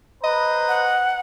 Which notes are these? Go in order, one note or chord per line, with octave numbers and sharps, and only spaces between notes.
B4 C5 D#5 A#5
F#5